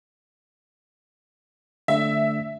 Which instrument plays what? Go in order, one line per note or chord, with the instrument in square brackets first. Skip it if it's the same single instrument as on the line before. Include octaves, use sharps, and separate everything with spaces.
[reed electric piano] D3 A3 D4 [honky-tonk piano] E5